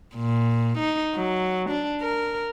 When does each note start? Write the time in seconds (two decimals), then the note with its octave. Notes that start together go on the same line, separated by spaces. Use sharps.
0.16 A#2
0.78 D#4
1.15 F#3
1.70 D4
2.01 A#4